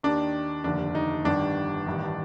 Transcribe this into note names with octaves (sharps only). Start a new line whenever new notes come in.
D#2 D#3 D4
F1 D#2 D3 D4
D#4
G1 G2 D#3 D4
A1 G2 D#3